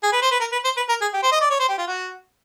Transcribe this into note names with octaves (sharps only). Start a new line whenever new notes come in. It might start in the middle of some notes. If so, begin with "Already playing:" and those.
G#4
B4
C5
B4
A#4
B4
C5
B4
A#4
G#4
G4
C5
D#5
D5
C#5
C5
G4
F4
F#4